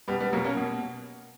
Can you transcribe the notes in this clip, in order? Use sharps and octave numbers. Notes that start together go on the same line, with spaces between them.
B2 G3 B3
G3 B3
B2 F#3 A#3
A#3 C#4
B2